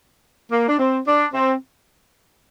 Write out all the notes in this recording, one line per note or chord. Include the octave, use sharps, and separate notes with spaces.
A#3
D4
C4
D4
C4